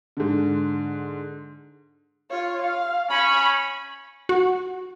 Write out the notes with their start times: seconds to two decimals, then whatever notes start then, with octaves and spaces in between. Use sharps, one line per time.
0.17 G#2 D3
2.30 F4 C#5
2.62 F5
3.10 C#4 B5 C#6
4.29 F#4